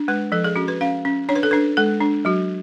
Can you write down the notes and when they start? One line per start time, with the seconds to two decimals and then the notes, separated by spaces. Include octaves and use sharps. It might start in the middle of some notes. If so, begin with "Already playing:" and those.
Already playing: D4
0.08 G#3 B4
0.32 F3 A4
0.44 G#4
0.56 C#4 F#4
0.68 B4
0.81 C#4 F5
1.05 C#4
1.29 D4 C#5
1.35 B4
1.43 A4
1.51 D4 B4
1.77 G#3 A4
2.01 D4
2.25 F#3 F#4